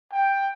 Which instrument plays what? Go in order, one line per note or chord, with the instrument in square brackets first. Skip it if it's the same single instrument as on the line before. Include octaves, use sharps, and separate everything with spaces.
[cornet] G5